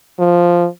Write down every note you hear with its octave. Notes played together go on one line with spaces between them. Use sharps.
F3